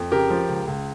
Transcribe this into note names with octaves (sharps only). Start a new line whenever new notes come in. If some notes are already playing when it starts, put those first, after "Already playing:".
Already playing: F2
C#3 G4 A#4
F3
C#2
C#2